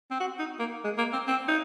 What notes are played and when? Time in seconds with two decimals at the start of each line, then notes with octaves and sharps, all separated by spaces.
0.11 C4
0.20 F#4
0.39 D#4
0.59 A#3
0.84 G#3
0.98 A#3
1.13 C4
1.28 C4
1.48 D#4